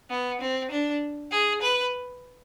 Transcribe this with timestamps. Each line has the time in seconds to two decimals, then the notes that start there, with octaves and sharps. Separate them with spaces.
0.10 B3
0.41 C4
0.71 D4
1.31 G#4
1.62 B4